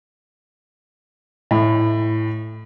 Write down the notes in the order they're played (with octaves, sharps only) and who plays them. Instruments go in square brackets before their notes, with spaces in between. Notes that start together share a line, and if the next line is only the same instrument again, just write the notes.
[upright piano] A2